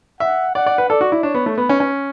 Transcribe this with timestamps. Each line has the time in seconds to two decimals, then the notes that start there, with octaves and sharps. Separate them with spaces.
0.20 E5 F#5
0.55 D5 F#5
0.66 D5
0.78 B4
0.89 A4 D5
1.01 F#4
1.12 E4
1.23 D4 C#5
1.34 B3
1.46 A3
1.58 B3 B4
1.69 C#4
1.80 C#4